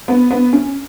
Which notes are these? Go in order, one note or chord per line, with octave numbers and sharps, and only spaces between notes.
B3
B3
C#4